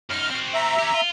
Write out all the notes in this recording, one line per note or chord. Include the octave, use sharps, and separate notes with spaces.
F#2 D#4 F6
C4 F#4
E5 A#5
C#4 G4
F4